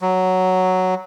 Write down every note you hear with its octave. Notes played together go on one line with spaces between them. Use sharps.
F#3